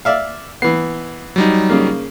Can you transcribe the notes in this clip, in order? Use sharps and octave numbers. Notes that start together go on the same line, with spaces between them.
D5 E5 F5
E3 B3 C7
F#3 G3 D#4
C#3 A#3